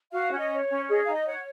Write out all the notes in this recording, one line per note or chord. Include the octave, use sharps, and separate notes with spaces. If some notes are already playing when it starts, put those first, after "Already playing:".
F#4 F5
C#4
D#5
C#5
C#4
G#4 D#5
D#4 F5
D#5
C#5 F#5